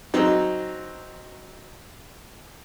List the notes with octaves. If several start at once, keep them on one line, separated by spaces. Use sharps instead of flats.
F#3 C4 D#4